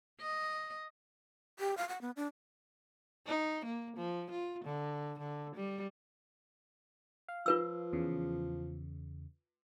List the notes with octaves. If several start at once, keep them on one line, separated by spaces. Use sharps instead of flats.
D#5
G4
F5
F#5
B3
D4
D#4
A#3
F3
F4
D3
D3
G3
F5
F3 F4 B4 E6
E2 C#3